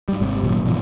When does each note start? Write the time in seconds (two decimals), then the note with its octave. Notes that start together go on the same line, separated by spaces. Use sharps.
0.09 G#2 G3
0.20 G#1 C3
0.43 D#1 G#1 F#2 A#2
0.65 G#1 B2 E3 G3